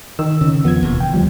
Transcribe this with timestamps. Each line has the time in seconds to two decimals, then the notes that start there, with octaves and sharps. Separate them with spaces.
0.19 D#3 E6
0.41 C#3
0.64 E2 F3 B3 G#6
0.83 E1 D#2
1.00 D#2 G5
1.13 D2 F3 G3